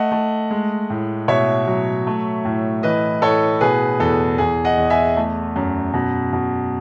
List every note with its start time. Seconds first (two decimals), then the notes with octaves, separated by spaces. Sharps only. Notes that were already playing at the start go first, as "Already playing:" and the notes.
Already playing: A3 D#5 F#5
0.12 A3
0.51 G#3
0.90 A2
1.28 B2 C#5 E5
1.67 F#3
2.07 A3
2.45 A2
2.83 E3 B4 D#5
3.22 A2 A4 C#5
3.61 B2 G#4 B4
4.00 E2 A4
4.38 E2 G#4
4.65 D#5 F#5
4.77 E2
4.90 E5 G#5
5.17 A3
5.56 F#2
5.94 B2
6.33 B2